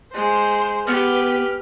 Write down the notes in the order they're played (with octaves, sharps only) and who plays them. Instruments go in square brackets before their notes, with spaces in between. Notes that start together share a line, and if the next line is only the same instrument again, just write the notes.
[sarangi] G#3 [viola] C5
[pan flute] B3 [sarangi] G4 [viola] B4 [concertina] F6